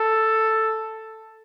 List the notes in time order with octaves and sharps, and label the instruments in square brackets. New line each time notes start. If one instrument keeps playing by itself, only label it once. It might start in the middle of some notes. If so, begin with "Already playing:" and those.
Already playing: [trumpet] A4